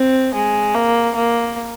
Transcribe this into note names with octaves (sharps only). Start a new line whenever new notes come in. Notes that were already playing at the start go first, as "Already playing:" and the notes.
Already playing: C4
G#3
A#3
A#3